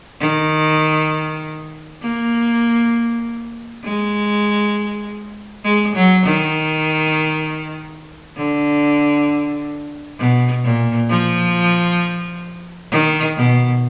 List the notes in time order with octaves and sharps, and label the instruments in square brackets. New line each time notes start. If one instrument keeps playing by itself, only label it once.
[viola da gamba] D#3
A#3
G#3
G#3
F#3
D#3
D3
B2
A#2
F3
D#3
B2